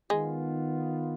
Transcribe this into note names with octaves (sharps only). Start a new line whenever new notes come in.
D#3 G#3 B3 F4